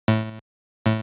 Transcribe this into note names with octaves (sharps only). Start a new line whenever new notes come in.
A2
A2